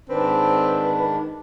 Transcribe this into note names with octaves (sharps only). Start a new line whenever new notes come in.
G#2 D#3 C4 D4 B4